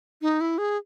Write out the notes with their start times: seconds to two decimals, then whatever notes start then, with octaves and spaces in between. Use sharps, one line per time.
0.22 D#4
0.41 E4
0.58 G#4